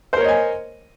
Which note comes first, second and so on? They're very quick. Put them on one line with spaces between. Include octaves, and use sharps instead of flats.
C5 A#4 C#5 D#5 G#5